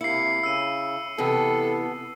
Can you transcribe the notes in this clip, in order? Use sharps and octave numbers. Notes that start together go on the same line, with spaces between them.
C3 A#3 E4 C7 C#7
C#3 E6 D#7
C3 E3 B3 A4